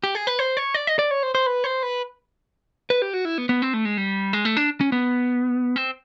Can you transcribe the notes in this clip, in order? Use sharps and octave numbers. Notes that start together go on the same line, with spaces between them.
G4
G#4
B4
C5
C#5
D5
D#5
D5
C#5
C5
C5
B4
C5
B4
B4
G4
F#4
E4
B3
B3
C4
A3
G#3
G3
G#3
A3
D4
C#4
B3
C4